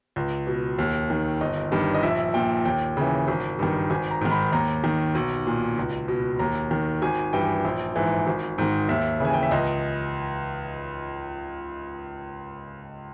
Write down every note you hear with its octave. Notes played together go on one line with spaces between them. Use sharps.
C#2
B2
D#2
D#3
G1 D#5
G2 D#3
D#5
A#1 E5
A#2 G5
D#2 G5
C#3 E3
G#1
G2 D#3
G#1 G#5
A#5
G#2 D#3
B5
D#2 A#5
D#3
B1
A#2
C#2
B2
D#2 A#5
D#3
G#1 G#5
G2 E3 G5
A#1
G#2 E3
G#1
G#2 D#3
D#2 E5
C#3 E3 G#5
G5
E5
C#2 D#5